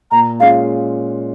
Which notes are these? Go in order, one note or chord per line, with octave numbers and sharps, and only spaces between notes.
A#2 A#5
G#3 C#4 F4 F5